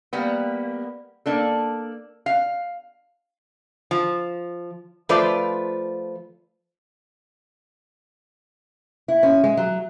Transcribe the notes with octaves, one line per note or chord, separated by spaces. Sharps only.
G3 A#3 B3
A#3 D4 A4
F5
F3
F3 A3 F4 B4 C5 D5
E4
C#4
G#3
F#3